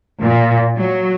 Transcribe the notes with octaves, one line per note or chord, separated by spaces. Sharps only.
A#2
F#3